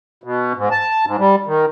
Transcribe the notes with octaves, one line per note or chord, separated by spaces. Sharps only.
B2
G#2
A5
G#2
G3
D#3